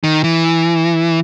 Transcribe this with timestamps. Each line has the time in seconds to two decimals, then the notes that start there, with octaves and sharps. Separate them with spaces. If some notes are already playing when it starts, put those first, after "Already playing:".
0.04 D#3
0.24 E3